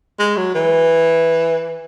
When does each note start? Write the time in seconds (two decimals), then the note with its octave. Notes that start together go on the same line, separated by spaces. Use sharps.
0.19 G#3
0.37 F#3
0.54 E3